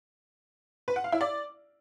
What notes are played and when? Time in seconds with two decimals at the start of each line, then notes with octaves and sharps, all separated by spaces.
0.88 B4
0.96 F#5
1.04 F5
1.12 E4
1.21 D5